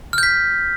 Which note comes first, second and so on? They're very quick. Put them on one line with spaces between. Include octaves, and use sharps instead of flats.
F6 G6 B6